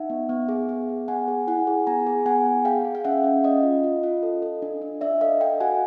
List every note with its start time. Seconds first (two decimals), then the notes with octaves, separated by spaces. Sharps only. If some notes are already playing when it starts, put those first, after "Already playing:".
Already playing: D#4 E5 F#5
0.10 B3
0.29 B3
0.49 G#4
0.69 B3
0.89 B3
1.08 B3 F#5 G#5
1.28 G#4
1.47 E4 F#5 G#5
1.67 G#4
1.87 B3 G#5 A#5
2.07 G#4
2.26 B3 F#5 G#5
2.46 B3
2.65 G#4 F5 G5
2.85 G#4
2.95 F5
3.05 C#4 E5 F#5
3.24 C#4
3.44 C#4 D#5 F5
3.63 F4
3.84 F4
4.03 F4
4.23 A4
4.42 A4
4.62 D4
4.82 D4
5.01 D4 D5 E5
5.21 A4 D#5 F5
5.41 A4 F5 G5
5.60 F#4 F#5 G#5